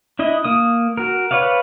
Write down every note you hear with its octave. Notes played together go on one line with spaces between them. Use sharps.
D4 E4 D#5
A#3 D#6
F#4 A#4
B4 C#5 D5 F5